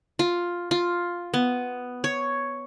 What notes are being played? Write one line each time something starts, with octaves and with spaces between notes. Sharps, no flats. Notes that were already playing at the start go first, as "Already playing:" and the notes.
F4
F4
B3
C#5